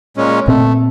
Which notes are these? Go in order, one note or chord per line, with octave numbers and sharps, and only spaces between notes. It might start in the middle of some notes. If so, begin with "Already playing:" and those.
A#2 G#3 C#4
A#2 A3 C4